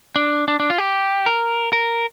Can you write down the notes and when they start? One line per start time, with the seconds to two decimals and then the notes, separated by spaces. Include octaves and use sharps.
0.16 D4
0.48 D4
0.60 D4
0.70 F4
0.78 G4
1.26 A#4
1.73 A#4